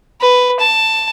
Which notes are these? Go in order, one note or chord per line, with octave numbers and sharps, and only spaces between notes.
B4
A5